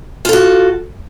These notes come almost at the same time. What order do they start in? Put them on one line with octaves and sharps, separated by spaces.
F4 A4 F#4